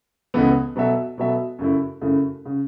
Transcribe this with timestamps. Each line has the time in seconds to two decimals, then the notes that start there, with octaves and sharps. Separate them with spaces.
0.34 C#2 C#3 E3 B3 A4
0.76 B2 F#3 B3 A4 E5
1.18 B2 F#3 B3 A4 E5
1.59 F#2 C#3 A3 E4
2.01 F#2 C#3 A3 E4
2.45 C#3